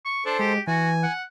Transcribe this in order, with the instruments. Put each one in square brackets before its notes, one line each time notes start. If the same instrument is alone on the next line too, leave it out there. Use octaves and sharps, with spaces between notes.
[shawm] C#6
[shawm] D4 [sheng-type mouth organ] A4 C5
[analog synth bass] G#3 [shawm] G4
[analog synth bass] E3 [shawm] F#4 [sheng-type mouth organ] G#5
[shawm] F#5